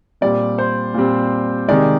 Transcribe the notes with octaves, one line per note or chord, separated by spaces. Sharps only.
A#2 G3 C4 D5
C5
A#2 G3 C4
C3 D#3 G#3 D5